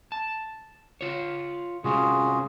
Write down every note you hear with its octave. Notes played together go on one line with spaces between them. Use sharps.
A5
F4 C#5
C3 G#3 C#4 F4 F#4 G#4